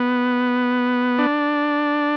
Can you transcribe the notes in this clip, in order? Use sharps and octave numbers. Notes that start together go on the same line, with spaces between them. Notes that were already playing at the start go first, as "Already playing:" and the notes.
Already playing: B3
D4